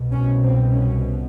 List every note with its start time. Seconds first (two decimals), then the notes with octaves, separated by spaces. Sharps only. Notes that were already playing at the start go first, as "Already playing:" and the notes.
Already playing: C2 B2
0.12 C#4
0.43 C4
0.72 C#4